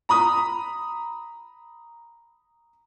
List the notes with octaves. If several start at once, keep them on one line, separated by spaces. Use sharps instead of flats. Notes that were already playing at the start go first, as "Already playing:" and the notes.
A#5 B5 D#6